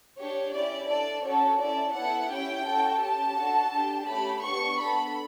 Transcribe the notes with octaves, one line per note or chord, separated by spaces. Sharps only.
D4 G4 C#5
C#4 E4 G4 D5
D4 A4 D5
C#4 F#4 A4 C#5
C#4 E4 A4 D5
B3 E4 A4 F#5
C#4 E4 G4 G5
C#4 F#4 A4
C#4 G4 A5
D4 F#4 A4
D4 G4
A3 C#4 G4 B5
B3 D4 G4 C#6
B3 D4 A4 B5